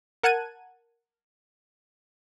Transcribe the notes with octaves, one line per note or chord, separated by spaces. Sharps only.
A#4 F#5 A5 F#6 G#6 D#7